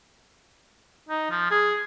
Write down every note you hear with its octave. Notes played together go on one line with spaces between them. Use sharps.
D#4
F3
G#4